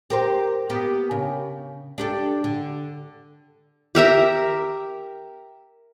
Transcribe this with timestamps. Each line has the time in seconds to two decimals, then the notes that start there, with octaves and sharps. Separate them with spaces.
0.10 G4 A#4 C5
0.69 A#3 B3 G4
1.11 C#3
1.98 D4 G4 A4
2.44 D3
3.95 G4 A#4 E5 A#5